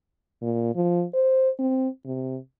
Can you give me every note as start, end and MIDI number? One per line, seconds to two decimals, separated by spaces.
0.42 0.72 46
0.76 1.04 53
1.14 1.50 72
1.59 1.88 60
2.06 2.38 48